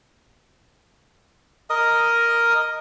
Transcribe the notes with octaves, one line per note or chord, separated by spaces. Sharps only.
A#4 D#5 D#6